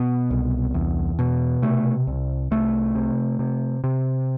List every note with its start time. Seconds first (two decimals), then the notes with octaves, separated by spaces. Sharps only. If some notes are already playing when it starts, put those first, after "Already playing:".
Already playing: B2 B3
0.30 C2
0.74 E2
1.19 B2
1.62 C3 A3
2.07 C2
2.51 C2 A3
2.95 C3
3.39 C3
3.84 C3